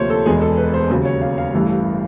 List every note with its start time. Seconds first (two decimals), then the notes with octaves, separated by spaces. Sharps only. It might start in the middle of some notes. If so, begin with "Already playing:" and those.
Already playing: D2 C3 F3 A#3 C5 C#5
0.10 A4
0.26 E1 E2 B2 G#3 G#4
0.42 A4
0.58 B4
0.74 C5
0.90 D#2 C#3 F#3
1.05 C#5
1.21 F5
1.38 F5
1.53 A1 G2 E3 A3